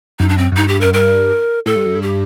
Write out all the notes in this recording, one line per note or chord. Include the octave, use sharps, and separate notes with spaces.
F#2 D#4
D4
C4
F#2
G2 D#4
G4
F#2 A#4
G2 A#4
A2 A4
G2
F#2
G2
G4